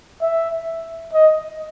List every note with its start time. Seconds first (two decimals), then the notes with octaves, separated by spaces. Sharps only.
0.22 E5
1.13 D#5